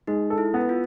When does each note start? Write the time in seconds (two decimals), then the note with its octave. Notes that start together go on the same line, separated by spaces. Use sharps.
0.07 G#3 D#4
0.30 A4
0.38 E4
0.54 B3
0.69 F4